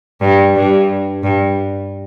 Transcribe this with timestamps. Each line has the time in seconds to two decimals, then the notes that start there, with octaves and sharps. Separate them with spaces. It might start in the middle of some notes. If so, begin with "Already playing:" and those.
0.21 G2
0.55 G2
1.23 G2